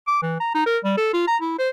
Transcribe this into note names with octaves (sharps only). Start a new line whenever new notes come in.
D6
E3
A#5
D#4
A#4
G3
A4
F4
A#5
E4
C5